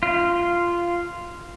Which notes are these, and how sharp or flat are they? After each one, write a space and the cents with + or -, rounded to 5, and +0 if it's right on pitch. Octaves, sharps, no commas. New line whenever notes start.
F4 -10